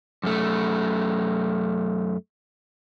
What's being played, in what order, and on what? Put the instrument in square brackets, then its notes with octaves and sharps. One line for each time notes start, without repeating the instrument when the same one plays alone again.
[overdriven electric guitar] F#2 A3